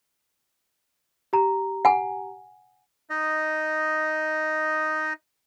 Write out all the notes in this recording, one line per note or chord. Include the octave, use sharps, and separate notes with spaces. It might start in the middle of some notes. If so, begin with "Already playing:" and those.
G4 A#5
F#5 G#5
D#4 D#5